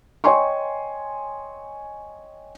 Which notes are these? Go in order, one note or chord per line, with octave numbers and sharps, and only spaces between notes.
C#5 D#5 G5 G#5 C6 C#6